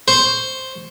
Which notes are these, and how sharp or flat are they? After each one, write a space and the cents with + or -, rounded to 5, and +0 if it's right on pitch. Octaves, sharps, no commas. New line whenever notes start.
C5 +0 C#6 +0